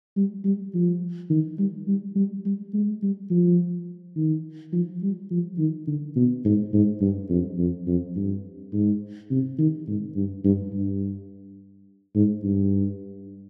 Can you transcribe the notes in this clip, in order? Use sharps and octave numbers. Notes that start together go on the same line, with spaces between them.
G3
G3
F3
D#3
G3
G3
G3
G3
G#3
G3
F3
D#3
F3
G3
F3
D#3
D3
B2
G#2
G#2
G2
F2
F2
F2
G2
G#2
C3
D#3
G#2
G2
G2
G2
G#2
G2